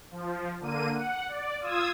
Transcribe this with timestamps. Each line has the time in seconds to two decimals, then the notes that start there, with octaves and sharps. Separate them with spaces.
0.11 F3
0.60 D3 A#3 D#7
0.94 F#5
1.29 D5
1.60 F4 D#6 E6 G#6